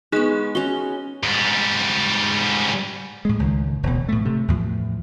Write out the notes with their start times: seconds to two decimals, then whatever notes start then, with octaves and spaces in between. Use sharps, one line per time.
0.12 G#3 B3 D#4 G#4 F#6
0.55 C#4 F#4 G7
1.23 G#2 G3
3.25 A2 G#3
3.39 C#2 D#3
3.83 E1 D2 B2
4.09 A2 A3
4.25 C3 A3
4.48 E2 A2 F3